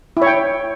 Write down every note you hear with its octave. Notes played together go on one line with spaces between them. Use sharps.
E4 C#5 G5